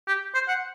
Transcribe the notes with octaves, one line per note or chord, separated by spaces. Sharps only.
G4
C5
F#5